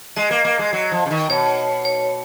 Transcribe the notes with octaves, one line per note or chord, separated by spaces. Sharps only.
G#3 D#5
A#3
A#3
G#3
F#3
F3
C#3
D#3
B2 C#5
C#5